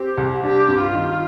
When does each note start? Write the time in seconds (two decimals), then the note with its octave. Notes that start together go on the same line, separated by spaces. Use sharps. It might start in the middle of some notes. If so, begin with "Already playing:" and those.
Already playing: C4 G4
0.18 C2
0.43 D4 G4
0.68 G2
0.81 F4
0.93 D#3